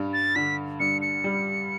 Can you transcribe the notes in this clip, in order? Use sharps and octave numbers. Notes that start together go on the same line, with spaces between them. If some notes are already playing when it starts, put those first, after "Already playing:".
Already playing: G2 G3
A6
D3 B6
G2 C#7
C#7
G3